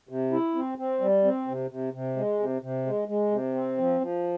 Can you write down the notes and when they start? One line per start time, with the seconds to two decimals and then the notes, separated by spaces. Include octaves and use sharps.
0.09 C3
0.32 E4
0.55 C4
0.78 C4
1.01 G3
1.24 C4
1.48 C3
1.71 C3
1.93 C3
2.17 G#3
2.39 C3
2.62 C3
2.86 G#3
3.08 G#3
3.31 C3
3.55 C4
3.77 F3
4.01 F3